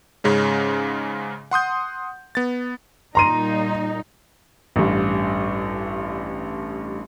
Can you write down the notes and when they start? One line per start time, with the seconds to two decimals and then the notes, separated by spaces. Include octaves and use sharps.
0.24 G#2 C#3 G#3 C#4
1.51 F#5 C6 D#6 G6
2.35 B3 A6
3.15 A#2 G3 D#4 A#5 C6 D#7
4.76 A1 G2